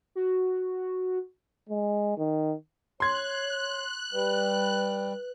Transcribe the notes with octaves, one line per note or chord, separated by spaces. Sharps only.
F#4
G#3
D#3
C#5 C6 F#6 G#6
G3 B4